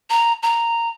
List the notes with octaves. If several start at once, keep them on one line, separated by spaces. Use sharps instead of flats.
A#5
A#5